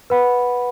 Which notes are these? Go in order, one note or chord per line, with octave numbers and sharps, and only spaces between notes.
B4 F#5 B5